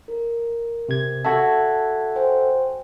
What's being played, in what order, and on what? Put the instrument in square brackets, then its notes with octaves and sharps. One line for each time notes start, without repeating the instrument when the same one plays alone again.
[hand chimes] A#4
[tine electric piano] C3 G#6
[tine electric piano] F#4 A4 E5 [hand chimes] A5 G#6
[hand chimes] C5 G5 G#5